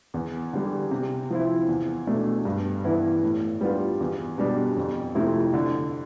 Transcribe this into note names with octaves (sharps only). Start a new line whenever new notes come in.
E2
D3 G3
C3
F3 C4 E4
E2
B2 A3 D4
G2
E3 B3 E4
A2
G3 B3 D4 F4
E2
B2 G3 D4
F2
C3 F3 A3 E4
D3